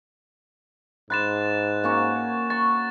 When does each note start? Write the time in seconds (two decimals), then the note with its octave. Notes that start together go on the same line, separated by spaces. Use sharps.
1.10 G#2 B5 C6 D6 F#6 A6 E7
1.84 A#3 C#4 F#4
2.50 C#6 A6